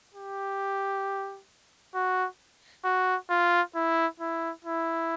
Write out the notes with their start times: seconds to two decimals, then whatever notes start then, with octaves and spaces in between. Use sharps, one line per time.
0.14 G4
1.95 F#4
2.85 F#4
3.30 F4
3.75 E4
4.20 E4
4.65 E4